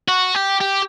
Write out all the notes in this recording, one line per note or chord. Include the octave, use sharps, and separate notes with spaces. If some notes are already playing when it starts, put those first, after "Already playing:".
F#4
G4
G4